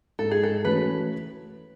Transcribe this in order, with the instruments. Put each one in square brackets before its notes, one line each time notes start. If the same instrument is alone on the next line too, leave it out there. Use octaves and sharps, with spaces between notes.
[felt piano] G#2 [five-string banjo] A4
[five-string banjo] G#4
A4
[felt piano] E3 A3 C#4 F#4 [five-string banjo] B4